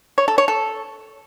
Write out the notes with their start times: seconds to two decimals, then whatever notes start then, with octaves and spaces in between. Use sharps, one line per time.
0.18 C#5
0.28 A4
0.38 C#5
0.48 A4